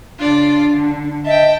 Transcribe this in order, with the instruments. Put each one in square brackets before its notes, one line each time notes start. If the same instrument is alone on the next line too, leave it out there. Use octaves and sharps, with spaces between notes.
[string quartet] C#3 F4 D5 [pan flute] D4
[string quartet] D3
[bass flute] D#5 [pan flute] E5 [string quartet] G5 A5